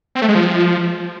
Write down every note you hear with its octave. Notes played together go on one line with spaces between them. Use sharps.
C4
A3
G#3
F3